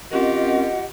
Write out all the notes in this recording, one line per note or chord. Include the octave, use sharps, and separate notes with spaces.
C4 C#4 F4 G4 A#4 D#5 F#5